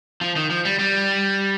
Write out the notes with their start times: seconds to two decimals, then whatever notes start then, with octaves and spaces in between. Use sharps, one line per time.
0.21 F3
0.36 D#3
0.50 F3
0.65 G3
0.79 G3